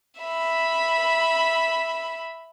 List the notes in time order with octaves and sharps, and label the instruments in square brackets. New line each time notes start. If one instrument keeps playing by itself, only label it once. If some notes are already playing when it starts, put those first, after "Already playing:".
[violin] E5 B5